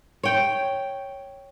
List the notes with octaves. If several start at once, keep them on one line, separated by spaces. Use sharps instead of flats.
C#5 G5